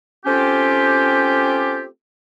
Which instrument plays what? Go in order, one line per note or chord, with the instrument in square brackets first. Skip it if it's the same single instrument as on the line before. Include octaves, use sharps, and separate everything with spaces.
[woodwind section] A3 C4 C#4 F4 G4